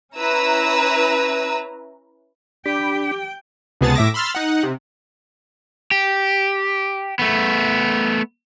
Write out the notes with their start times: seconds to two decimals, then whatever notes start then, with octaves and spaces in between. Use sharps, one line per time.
0.16 C#4 E4 B4 A#5 E6
2.66 D4 G4 G5 B5
3.81 C#2 C3 B3 G#4 A5 A6
3.95 A2 E5 D6 A#6
4.14 B5 C6 E6 F6 A6
4.35 D#4 F#5
4.63 C3
5.91 G4
7.19 A3 B3